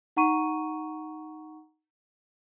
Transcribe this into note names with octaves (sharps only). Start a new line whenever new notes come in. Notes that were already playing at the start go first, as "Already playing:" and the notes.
D#4 F#5 A#5 C#6 D#7